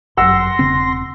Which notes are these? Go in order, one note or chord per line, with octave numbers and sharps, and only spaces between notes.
G1 F#2 F#5 C6 E6 A#6
E1 C#3 C4